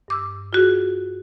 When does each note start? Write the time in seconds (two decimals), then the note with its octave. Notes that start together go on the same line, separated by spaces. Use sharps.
0.08 G2 D6 E6
0.53 F4 F#4 G#4